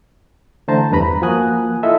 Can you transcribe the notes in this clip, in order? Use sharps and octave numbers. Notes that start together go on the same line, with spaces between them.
D3 E3 A3 C5 A5 A#5
E2 G2 B4 A#5 B5
F3 A#3 F#4 G#5 D#6 F#6
E4 F4 A4 D#5 E5